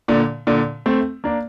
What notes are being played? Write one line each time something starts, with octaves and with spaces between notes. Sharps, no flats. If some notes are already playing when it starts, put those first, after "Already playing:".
A#2 D3
A#2 D3
A3 C4
A#3 D4